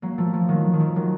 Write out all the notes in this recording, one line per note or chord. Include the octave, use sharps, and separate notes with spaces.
F#3 A#3
F3 A3
F3
D#3 F#3
F3
D#3
F3
D#3 F#3